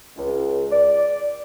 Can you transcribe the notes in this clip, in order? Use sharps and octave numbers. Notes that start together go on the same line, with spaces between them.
C#2
D5